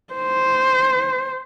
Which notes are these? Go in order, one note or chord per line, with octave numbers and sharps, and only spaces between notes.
C5